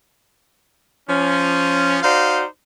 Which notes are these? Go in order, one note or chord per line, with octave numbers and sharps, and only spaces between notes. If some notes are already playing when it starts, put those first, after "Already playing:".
F3 C#4
D#4 F#4 C5 D5 F5